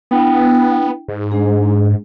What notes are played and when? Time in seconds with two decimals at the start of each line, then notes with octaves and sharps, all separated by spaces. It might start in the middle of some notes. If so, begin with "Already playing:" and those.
0.11 B3 D4 E4 G5
1.08 G#2
1.32 G#3 D4 G#4